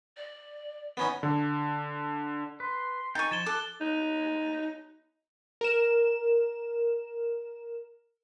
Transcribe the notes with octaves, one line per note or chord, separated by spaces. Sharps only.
D5
B3 C#4 D#4
D3
B4 C6
D#4 G5 G#5 C#6 A6
F3 G#6 A6 E7 G7
A4 D6 F#6
D#4
A#4 E7